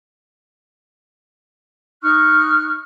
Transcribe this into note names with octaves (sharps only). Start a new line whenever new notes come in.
D#4 C#6 F6 F#6